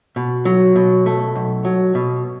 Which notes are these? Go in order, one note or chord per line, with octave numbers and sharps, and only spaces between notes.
B2
F#3
B2
A3
B1
F#3
B2